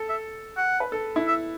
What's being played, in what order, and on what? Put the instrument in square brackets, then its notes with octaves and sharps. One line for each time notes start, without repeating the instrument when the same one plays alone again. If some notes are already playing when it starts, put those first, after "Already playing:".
Already playing: [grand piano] A4
[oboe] E5
F#5
[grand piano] B4
A4
E4
[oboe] E5